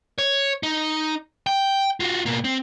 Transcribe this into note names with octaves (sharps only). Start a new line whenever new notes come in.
C#5
D#4
G5
F4 F#4
B2 A#3
C4